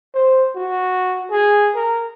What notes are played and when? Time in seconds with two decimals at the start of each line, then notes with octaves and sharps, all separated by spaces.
0.14 C5
0.55 F#4
1.30 G#4
1.75 A#4